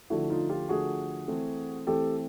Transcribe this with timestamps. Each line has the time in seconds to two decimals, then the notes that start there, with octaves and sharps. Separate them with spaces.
0.10 D3 F3 A3 E4 F#4
0.30 D#4 F4
0.49 F4 G4
0.69 D3 F3 A3 F#4 G#4
1.28 E3 A3 C4
1.87 E3 A3 C4 G4 A4